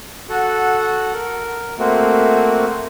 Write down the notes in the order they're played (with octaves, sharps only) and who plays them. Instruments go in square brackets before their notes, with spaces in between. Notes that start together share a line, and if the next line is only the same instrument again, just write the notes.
[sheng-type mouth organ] F#4 A4 F#5
A#4
A3 A#3 C4 F#4